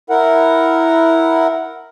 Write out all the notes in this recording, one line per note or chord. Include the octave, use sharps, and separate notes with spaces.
E4 A#4 F#5